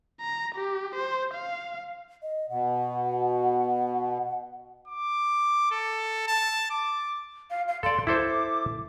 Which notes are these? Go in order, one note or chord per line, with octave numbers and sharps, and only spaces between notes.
A#5
G4
C5
F5
D#5
B2 F#5
D6
A4
A5
D6
F5
F5
A4 D5 C6
E4 A4 C5 D6